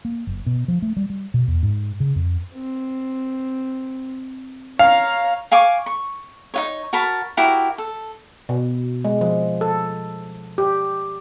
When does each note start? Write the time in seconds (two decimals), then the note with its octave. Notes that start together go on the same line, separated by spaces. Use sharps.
0.05 A#3
0.27 F#1
0.46 B2
0.68 F3
0.82 A3
0.97 G3
1.10 G3
1.34 B2
1.48 E2
1.63 G#2
2.00 C#3
2.16 F2
2.54 C4
4.79 C#5 F5 A#5
5.51 F5 G#5 C#6 D6
5.86 C#6
6.54 D#4 F4 C#5
6.93 F#4 A#4 A5 B5
7.37 E4 F#4 G4 A#4
7.78 A4
8.49 B2
9.05 G#3
9.21 F3
9.61 A4
10.58 G4